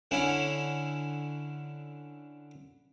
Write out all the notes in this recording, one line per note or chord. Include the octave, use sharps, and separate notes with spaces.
D3 C#4 E4